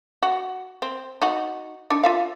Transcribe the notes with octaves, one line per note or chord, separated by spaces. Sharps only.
F#4
C4
D#4 F#4
D4 D#4
F4 E5 F5